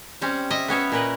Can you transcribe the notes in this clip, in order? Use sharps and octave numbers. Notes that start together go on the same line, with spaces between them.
G3 C4 C#4
D#5 E5
B3 C#4 C#5 E5
A#2 A#4 B4